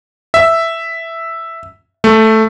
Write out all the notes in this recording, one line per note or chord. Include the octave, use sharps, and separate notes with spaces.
E5
A3